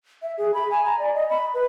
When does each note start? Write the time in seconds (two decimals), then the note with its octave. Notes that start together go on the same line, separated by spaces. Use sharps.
0.22 E5
0.38 G#4
0.54 B5
0.71 G#5
0.86 A#5
0.99 D5
1.14 D#5
1.29 B5
1.54 B4